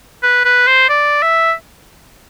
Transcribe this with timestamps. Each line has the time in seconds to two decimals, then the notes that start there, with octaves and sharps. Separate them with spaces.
0.23 B4
0.45 B4
0.67 C5
0.90 D5
1.23 E5